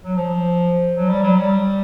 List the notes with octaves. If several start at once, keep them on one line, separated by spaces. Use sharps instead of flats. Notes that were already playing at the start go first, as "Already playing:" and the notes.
F#3
F3
F#3
G3
F#3
G3